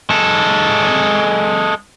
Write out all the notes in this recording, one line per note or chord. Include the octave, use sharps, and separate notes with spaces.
G#3 A4